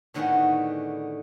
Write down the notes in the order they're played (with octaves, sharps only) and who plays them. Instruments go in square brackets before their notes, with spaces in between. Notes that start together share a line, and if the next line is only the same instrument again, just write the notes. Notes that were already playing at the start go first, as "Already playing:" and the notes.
[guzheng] A2 D3 D#3 B3 F#4 G#4